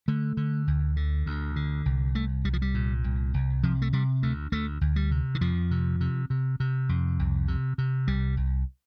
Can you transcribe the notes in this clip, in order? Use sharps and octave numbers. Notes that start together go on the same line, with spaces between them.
D3 A3
D3
D2
D3
D2
D3
C2
C2 A3
C2 G3
F3
G3
A#2
C2
C2
C3 F3
A3
C3 G3
D2 A3
D2 A3
D2
G3
C3
D#3
F2 F3
C3
C3
C3
C3
F2
C2
C3
C3
C2 G3
C2